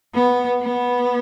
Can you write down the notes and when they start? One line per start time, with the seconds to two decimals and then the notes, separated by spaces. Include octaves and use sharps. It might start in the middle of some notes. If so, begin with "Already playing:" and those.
0.14 B3
0.62 B3